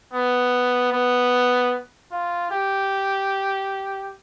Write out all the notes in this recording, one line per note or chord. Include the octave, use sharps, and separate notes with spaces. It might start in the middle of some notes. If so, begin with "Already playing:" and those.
B3
B3
F4
G4